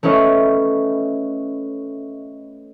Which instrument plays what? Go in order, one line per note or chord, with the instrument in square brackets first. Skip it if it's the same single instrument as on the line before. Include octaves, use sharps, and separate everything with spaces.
[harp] A3 C#4 E4 B4 D#5